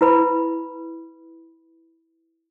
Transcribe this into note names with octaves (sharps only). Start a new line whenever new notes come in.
E4 B4 B5